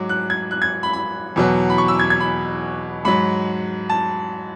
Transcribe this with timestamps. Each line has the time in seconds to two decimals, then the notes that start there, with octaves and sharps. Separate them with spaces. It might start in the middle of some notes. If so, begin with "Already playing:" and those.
Already playing: G#2 F#3 D6
0.09 F#6
0.30 G#6
0.51 F#6
0.62 G#6
0.83 B5
0.93 B5
1.36 E2 B2 F#3
1.70 B5
1.78 C#6
1.88 E6
2.00 G#6
2.10 G#6
2.20 B5
3.05 G#2 F#3 B5
3.90 A5